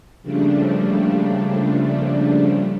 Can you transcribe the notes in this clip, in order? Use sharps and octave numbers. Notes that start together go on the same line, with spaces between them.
C#3 F3 G3 A3 A#3 D4